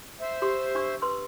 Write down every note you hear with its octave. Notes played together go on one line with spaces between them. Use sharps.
C5 E5
G4 C6 D#6
D4 C#6 E6
B4 C6 E6